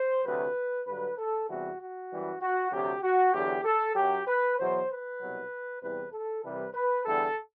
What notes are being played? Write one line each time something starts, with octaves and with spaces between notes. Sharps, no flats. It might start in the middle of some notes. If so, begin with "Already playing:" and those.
Already playing: C5
D2 C3 F#3 B4
G2 D3 F#3 B4
A4
E2 C3 E3 G3 F#4
F#4
F#2 E3 G3
F#4
D2 C3 F#3 G4
F#4
E2 D3 F#3 G4
A4
F#2 F#3 G4
B4
E2 B2 F#3 C5
B4
C2 B2 F#3
E2 C3 E3 G3 B4
A4
C2 C3 E3 G3 B4
B4
E2 D3 G3 A4